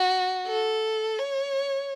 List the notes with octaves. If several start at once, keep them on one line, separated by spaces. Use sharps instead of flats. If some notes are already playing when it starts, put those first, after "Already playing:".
Already playing: F#4
A4
C#5